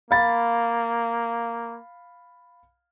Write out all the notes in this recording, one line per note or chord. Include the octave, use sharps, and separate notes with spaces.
A#3 F5 B5 A6